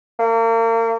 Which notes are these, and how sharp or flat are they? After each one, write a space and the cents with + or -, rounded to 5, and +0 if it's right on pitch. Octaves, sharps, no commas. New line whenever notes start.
A#3 -35